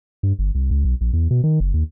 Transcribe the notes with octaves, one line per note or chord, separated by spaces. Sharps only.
G2
G1
C2
C#2
B1
A#1
E2
B2
D#3
F#1
D#2